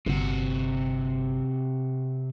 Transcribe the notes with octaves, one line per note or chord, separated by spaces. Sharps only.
G1 C3 F#4